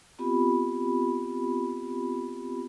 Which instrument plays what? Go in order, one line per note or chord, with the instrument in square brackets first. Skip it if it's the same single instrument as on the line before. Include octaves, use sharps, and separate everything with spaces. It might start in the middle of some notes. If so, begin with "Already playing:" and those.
[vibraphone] B3 C4 F4 G4 B5